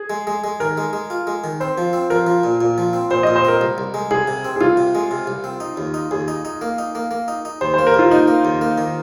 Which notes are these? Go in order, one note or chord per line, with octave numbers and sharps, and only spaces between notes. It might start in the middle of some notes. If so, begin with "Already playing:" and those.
Already playing: G#4
G#3
G#3
G#3
D#3 A#4
G#3
G#3
F4
G#3
D#3
C4 C5
F3
C4
F3 A#4
F3
A#2
A#2
F3
C4
A#2 C5
A#2 D#5
C5
C4 A#4
C2
C2
G#3
C2 G#4
C3
C4
G#4
C2 F4
C3
G#3
C3
C2
C4
D#4
D#2
D#4
D#2 G#4
D#4
D#4
A#3
D#4
A#3
A#3
D#4
D#4
D#2 C5
A#3 C5
A#4
D#2 F4
A#3 D#4
A#3
D#2
A#3
D#3